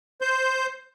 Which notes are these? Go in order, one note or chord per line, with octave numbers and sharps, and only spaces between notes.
C5 G6